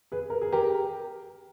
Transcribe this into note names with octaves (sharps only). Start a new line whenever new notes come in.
G#4 B4
A#4
G#4
G4 A#4